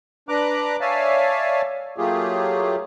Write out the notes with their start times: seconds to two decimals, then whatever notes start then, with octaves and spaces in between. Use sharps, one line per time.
0.29 D4 B4 A#5 D6 F#6
0.81 C#5 D5 E5 F5 G#5 A5
1.98 F#3 A3 A#3 F4 G4 G#4